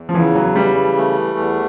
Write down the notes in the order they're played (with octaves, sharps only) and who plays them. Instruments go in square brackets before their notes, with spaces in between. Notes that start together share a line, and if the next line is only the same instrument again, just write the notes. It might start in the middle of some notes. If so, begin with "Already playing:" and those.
Already playing: [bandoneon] E2
[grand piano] F3
[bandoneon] C#3 [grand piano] E3
[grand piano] F#3
[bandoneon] E3 [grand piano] G3
[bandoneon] A3
E2